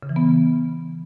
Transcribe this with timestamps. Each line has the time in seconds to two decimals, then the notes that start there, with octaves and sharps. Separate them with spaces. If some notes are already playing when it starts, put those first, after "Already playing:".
0.03 C#3
0.09 E3
0.16 B3